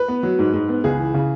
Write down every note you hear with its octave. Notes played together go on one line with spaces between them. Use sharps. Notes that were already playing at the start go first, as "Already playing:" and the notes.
Already playing: B4
B3
F#3
G#2
G#2
B3
C#2 G#4
E3
C#3